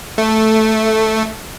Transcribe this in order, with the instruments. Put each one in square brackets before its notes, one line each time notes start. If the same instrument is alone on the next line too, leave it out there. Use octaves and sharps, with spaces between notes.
[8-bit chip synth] A3